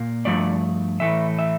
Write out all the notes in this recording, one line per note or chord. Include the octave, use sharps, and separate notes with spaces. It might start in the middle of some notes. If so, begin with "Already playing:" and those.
Already playing: A#2 A#3
G2 F3 A3 D5
A2 E3 A3 E5
E5